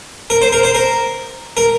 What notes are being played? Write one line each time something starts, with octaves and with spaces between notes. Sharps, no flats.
A#4
C5
A#4
C5
A#4
A#4